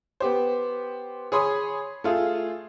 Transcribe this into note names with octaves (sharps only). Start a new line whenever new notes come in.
B3 G4 C5
G#4 C#5 B5 C6 D#6
A3 F4 G#4